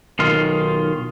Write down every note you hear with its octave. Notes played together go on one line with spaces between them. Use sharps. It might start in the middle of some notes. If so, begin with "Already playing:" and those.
B1 D#3 F4